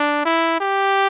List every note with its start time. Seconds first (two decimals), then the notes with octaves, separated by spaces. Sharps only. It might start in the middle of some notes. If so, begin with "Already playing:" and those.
Already playing: D4
0.25 E4
0.60 G4